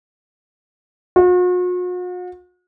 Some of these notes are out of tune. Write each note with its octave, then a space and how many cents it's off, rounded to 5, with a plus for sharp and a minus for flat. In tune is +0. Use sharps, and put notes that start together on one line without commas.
F#4 -45